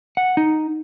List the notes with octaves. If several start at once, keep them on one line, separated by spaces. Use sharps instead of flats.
F#5
D#4